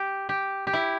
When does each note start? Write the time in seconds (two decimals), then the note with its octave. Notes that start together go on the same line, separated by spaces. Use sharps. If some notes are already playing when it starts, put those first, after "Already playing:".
Already playing: G4
0.29 G4
0.67 G4
0.73 E4